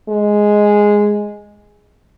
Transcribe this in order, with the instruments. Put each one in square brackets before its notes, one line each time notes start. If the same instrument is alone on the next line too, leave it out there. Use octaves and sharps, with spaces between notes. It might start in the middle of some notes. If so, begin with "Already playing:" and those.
[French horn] G#3